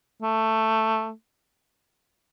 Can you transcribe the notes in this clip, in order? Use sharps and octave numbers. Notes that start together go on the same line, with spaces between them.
A3